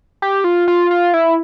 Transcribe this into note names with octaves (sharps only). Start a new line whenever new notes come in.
G4
F4
F4
F4
E4